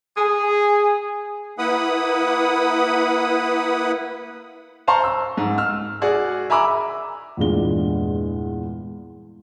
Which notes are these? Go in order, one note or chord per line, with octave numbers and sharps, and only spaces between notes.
G#4
A#3 E4 B4 F#5 B5 D#6
C5 F5 A5 A#5 C6 C#6
E6
G#2
E6 F6
F#4 G#4 D5
E5 G#5 A#5 B5 D6 E6
E2 G2 A#2 G#3 G7